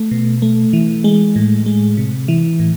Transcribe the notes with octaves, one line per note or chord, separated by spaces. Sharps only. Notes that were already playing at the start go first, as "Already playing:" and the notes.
Already playing: A3
B2
A3
E3
G#3
A2
G#3
C3
E3
A2